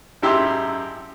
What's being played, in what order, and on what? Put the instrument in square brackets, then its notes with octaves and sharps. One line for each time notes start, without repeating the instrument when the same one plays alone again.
[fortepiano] G#1 F#2 E4 G4 C6 E6